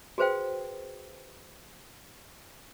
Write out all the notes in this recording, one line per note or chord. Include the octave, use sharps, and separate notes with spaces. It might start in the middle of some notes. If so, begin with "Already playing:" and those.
F#4 G#4 B4 C5 F5 G5